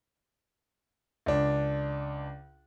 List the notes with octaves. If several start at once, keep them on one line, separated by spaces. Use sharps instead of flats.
C#2 D4